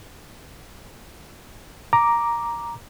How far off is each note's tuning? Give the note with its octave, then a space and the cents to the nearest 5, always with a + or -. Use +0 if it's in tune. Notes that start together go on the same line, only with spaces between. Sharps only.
A#5 +5 D6 +0